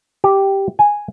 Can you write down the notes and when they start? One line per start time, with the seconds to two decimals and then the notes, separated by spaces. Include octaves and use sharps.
0.24 G4
0.79 G#5